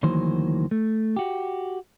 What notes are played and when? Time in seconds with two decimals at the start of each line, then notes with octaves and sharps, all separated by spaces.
0.03 D2 D#3 E3 F#3 A#3 C5
0.71 A3
1.16 F#4 G4